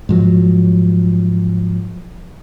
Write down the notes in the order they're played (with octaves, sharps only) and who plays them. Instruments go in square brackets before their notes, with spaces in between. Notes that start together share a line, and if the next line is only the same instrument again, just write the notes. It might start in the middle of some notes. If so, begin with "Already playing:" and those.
[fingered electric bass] G#2 F3 F#3